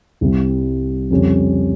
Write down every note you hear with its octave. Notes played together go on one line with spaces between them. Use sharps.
C2 C3 G3
F2 C#3 G3 C#4